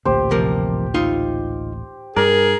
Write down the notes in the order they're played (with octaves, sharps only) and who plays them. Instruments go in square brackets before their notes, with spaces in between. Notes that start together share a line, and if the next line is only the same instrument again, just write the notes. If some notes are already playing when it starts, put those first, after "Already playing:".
[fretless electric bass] A1 D2 A#2 [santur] G4 C5
[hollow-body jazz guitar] C3 F3 A#4
D#4 F4 E5
[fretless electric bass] G2 [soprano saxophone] G#4 [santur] A#4 [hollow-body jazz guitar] D5